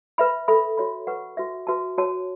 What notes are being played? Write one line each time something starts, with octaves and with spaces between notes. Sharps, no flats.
B4 E5 B5
A4 E5 B5
F#4 C#5 E5 B5
B4 F#5 C#6
F#4 B4 E5
F#4 B4 E5 A5
F#4 C#5 A5